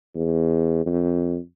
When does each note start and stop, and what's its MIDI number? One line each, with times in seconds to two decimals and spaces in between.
0.15 0.82 40
0.86 1.38 41